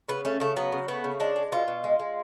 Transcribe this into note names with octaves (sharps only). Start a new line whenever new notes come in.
C#3 B3
A3 C#4
C#3 A3
F#3 B3
C#3
A3 B3
C#3
G#3 D4
G#3
B2 F4
B2
G#3
G#3